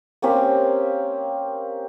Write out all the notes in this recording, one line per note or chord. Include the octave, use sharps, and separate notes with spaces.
A#3 C4 C#4 G4